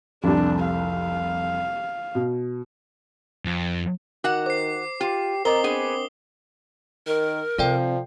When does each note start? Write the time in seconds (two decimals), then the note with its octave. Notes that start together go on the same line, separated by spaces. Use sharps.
0.24 F1 C2 D4
0.64 F5
2.15 B2
3.45 F2
4.24 D#3 F#4 F#5 D6
4.46 C5 D6 C7
5.01 F4 G4
5.45 C4 A#4 D#5 A#5 D6 D#6 G7
5.64 B3 D4 G#4 F#5
7.07 D#3 A#4
7.58 C3 F3 A4 D5 G5